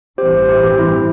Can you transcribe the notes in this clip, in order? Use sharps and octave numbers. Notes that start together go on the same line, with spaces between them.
A1 G2 E3 C4 G4 C5
G4 C5
G4
E4